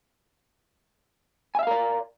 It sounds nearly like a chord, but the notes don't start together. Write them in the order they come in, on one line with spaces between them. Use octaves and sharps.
G#5 E5 F5 A#4 D5